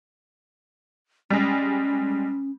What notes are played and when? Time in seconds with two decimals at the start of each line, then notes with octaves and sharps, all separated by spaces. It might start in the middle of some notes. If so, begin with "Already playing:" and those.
1.30 G3 G#3 C#4